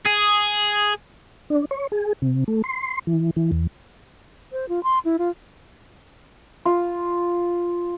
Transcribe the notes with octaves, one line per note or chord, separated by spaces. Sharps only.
G#4
D4
C#5
G#4
C3
A3
C6
E3
E3
E2
C5
F4
C6
E4
F4
F4